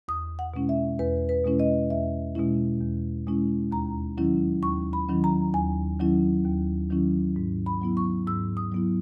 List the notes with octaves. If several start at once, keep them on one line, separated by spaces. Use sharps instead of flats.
E2 D#6
F#5
B2 G#3 C#4 E4
E5
E2 B4
B4
B2 G#3 C#4 E4
D#5
E2 E5
B2 G#3 C#4 E4
E2
B2 G#3 C#4 E4
D#2 A#5
D#3 F#3 C#4 E4
D#2 C#6
B5
D#3 F#3 C#4 E4
A#5
D#2 G#5
D#3 F#3 C#4 E4
D#2
D#3 F#3 C#4 E4
G#2
B5
F#3 B3 E4
C#6
G#2 E6
D#6
F#3 B3 E4